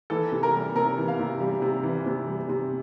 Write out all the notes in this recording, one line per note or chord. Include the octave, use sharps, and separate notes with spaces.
E3 A4
C3
A#4
G3
C3 A#4
E3
F5
C3
G3
C3
E3
C3
G3
C3